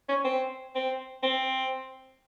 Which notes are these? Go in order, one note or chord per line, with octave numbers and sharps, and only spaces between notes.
C#4
C4
C4
C4